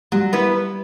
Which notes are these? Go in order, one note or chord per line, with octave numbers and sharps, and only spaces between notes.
F#3 G3
B3 E4 B4